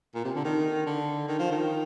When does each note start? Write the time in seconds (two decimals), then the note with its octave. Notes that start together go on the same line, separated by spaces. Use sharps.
0.15 A#2
0.25 C3
0.35 D3
0.45 D#3
0.86 D3
1.28 D#3
1.39 F3
1.52 D#3